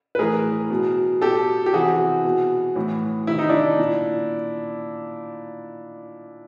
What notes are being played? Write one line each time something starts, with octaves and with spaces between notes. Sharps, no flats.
B4
A2 E3 G#4 A#4
B2
B2 G4 A4
G4
C3 E3 F#4 G#4
B2
A2 E3
C3 D#3 E4
D#4
D4 E4
A#2